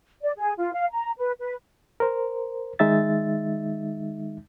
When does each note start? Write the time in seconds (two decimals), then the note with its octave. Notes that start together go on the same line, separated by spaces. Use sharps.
0.22 D5
0.37 G#4
0.58 F4
0.73 F5
0.91 A#5
1.17 B4
1.39 B4
2.00 A#4 C5
2.79 D#3 G#3 D#4 E5 A6